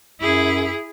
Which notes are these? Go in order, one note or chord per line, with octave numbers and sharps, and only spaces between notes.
F#2 E4 G#4